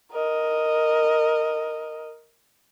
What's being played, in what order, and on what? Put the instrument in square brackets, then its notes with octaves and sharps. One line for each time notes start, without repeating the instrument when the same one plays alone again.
[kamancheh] A#4 D#5